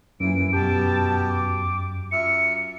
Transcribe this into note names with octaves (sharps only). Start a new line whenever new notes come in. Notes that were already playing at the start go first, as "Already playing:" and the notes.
F#2 A#2 E3 D7
B2 G4 A5
D6
F#2 F4 E5 C#7